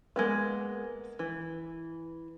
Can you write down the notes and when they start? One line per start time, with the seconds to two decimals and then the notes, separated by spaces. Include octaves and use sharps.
0.16 G#3 A#3 B3
1.19 E3